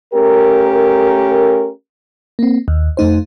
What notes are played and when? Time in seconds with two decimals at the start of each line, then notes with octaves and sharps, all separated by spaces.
0.14 A3 C#4 G4 A#4
2.39 A#3 C4
2.68 D#2
2.97 F2 A3 D#4 C5